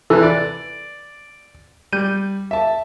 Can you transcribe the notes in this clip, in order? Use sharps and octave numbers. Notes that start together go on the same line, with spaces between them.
C3 E3 A4 B4
D5
G3 G6 D#7
E5 A5